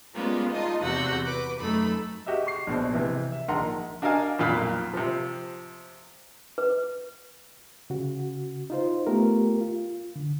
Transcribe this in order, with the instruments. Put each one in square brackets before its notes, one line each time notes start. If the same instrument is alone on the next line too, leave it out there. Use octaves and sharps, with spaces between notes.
[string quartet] G3 G#3 A#3 B3 C#4 F4
D#4 F4 D#5 A5
E2 C3 F#4 F#5 E6 G6
B4 D6
F#2 A3 D#4 B5
[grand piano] F#4 G4 D#5 E5
C#6 C7
A#1 B2 C5
C3 E3
E5
A#1 D#3 F#5 A#5 C6
[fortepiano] D4 F#4 A#4 D#5 F5 G#5
B1 F2 A#2 F5 B5
C3 F3
[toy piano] B4
[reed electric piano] C#3 F#4
D#4 F4 C5
A3 B3 F4 G4 A#4
F4
D3